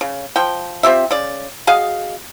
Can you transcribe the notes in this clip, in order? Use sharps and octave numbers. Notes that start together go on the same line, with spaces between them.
C#3
F3 G5
C4 F4 G4 E5
C#3 D5
F#4 G#4 D#5 F5